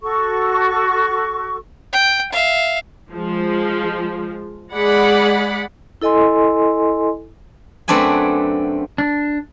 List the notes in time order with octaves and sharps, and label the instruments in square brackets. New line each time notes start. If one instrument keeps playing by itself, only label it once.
[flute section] F#4 A4 C#6
[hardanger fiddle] G5
E5 F5
[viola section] F3 G#3
G#3 G#4 D5 F#5 B5
[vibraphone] E4 A4 D#5 G#5 C6
[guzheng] F#2 A3 C4 D4 B4 G#5
[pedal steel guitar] D4